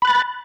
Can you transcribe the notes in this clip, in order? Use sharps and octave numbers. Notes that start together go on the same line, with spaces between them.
B5 F#6 A6